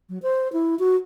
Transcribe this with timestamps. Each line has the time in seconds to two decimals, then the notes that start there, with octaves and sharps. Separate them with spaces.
0.09 F#3
0.22 C5
0.53 E4
0.79 F#4